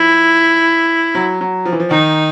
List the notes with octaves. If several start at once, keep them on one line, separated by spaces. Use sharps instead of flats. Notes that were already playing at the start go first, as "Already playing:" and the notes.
Already playing: F3 E4
F#3
F#3
F3
E3
F3
D#3 D#4